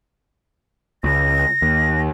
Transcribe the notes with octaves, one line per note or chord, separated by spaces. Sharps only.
C#2 A#6
D#2